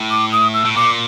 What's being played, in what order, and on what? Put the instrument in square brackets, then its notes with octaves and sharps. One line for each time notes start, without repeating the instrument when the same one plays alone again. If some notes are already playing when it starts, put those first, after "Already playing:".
Already playing: [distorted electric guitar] A2
[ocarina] D6
D#6
E6
[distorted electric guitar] A2
[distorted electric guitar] A#2 [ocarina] D6